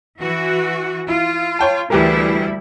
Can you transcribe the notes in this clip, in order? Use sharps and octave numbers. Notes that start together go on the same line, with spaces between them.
E3 F#4
E4 F4
C#5 G5 A5
D2 E3 G3 E4 G4 A#4